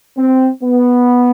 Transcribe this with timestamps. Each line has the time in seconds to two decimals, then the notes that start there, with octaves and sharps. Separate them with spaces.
0.17 C4
0.63 B3